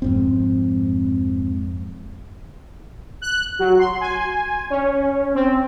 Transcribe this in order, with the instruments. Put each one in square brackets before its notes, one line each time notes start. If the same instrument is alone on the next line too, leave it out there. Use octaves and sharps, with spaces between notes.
[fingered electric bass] F2 G#2 C4
[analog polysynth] F#6
F#3
C6
G#5
C#4
C4